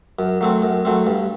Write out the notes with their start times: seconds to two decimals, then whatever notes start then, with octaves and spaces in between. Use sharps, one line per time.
0.19 F#2
0.41 F#3 A3 C4
0.62 F#2
0.85 F#3 A3 C4
1.07 G2